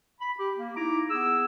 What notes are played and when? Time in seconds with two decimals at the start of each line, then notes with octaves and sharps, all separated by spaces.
0.21 B5
0.38 G4
0.57 A#3
0.77 D#4 E4 A#5 D6
1.11 B3 G#4 E6